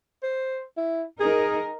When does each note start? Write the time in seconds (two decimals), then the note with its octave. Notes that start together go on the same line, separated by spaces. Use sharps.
0.23 C5
0.77 E4
1.20 D#4 G#4 A#4